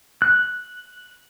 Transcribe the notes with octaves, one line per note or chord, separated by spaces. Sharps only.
F#6